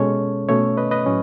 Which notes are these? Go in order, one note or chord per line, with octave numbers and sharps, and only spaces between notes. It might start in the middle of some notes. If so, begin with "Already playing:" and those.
Already playing: B2 G#3 C#4 A4 C#5
B2 A3 C#4 C#5 E5
B4 D#5
B4 D#5
A2 F#3 C#4